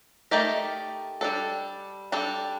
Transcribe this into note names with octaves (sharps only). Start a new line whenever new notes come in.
A3 D#4 G4 A#4 D5
G3 D4 A4
G3 D4 A4